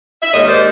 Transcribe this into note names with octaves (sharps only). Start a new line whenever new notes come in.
E5
D#2 D#3 G#3 C#5 D#5
C5 D5